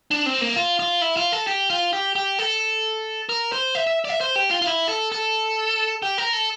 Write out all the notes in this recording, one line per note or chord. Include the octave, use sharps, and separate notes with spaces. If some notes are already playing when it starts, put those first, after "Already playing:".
D4
C4
A#3
F4
F4
E4
F4
A4
G4
F4
G4
G4
A4
A#4
C5
E5
E5
D5
E5
C5
G4
F4
F4
E4
A4
A4
G4
A#4
A4